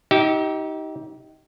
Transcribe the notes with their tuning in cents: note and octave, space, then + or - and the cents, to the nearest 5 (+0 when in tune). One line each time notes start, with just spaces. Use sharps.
D#4 +25 G4 -25 E5 -20